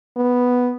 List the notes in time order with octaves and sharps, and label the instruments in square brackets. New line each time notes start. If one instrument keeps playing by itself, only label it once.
[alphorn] B3